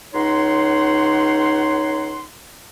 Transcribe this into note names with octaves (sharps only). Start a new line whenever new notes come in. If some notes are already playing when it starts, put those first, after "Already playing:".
C#2 D#4 C#5 F#5 C6